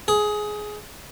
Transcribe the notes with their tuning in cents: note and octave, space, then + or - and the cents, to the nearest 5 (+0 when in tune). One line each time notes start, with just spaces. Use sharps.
G#4 +15